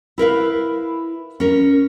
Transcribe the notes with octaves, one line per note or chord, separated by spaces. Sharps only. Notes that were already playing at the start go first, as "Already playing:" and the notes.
E4 A#4 B4 F5
C#4 A#4